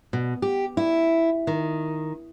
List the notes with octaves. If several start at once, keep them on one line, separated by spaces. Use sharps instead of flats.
B2
G4
E4
D#3